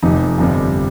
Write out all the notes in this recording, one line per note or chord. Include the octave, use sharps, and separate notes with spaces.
F1 F2 C3 D#4
G1 F2 C3 G3